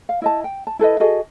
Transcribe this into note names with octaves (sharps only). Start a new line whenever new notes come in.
F5
E4 D#5 A5
G5
A5
E4 A4 B4 D#5
F#4 G#4 A4 D#5